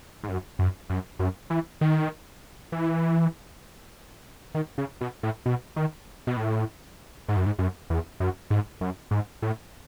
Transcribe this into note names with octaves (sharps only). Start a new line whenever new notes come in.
G#2
F#2
F#2
F#2
F#2
E3
D#3
E3
D#3
C#3
B2
A2
B2
D#3
B2
A2
G#2
F#2
G#2
F#2
E2
F#2
G#2
F#2
G#2
A2